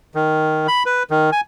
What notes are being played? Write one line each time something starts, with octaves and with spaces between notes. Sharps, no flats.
D#3
B5
B4
D#3
G#5